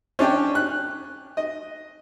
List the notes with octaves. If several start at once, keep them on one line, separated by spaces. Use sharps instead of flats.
C#4 D4 C#5 G5
F#6
D#5